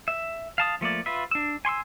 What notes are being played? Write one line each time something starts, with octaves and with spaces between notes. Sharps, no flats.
E5
F5 A5 D#6
F3 A3 A#3 D5
F4 B4 E5
D4 E6
G#5 C6 C#6 E6